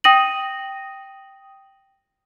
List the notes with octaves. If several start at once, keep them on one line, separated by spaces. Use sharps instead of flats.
G5 D#6 A#6 D#7 F#7